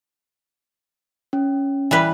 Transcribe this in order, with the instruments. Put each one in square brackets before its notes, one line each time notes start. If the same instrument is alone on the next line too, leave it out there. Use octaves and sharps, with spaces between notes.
[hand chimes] C#4
[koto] E3 G3 B4